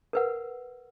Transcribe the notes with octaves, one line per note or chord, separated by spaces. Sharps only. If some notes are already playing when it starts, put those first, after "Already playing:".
A#4 B4 F#5